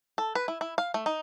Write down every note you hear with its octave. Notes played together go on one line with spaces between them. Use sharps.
A4
B4
E4
E4
F5
A3
D#4